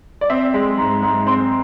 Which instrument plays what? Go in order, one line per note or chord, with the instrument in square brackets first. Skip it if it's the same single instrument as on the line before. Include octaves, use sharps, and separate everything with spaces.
[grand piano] D5
C4 E5
G#3
G#2
G#2
C4 C6